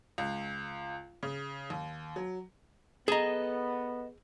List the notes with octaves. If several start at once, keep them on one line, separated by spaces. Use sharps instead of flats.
C#2
C#3
D#2
F#3
B3 G#4 A4 D#5 A#5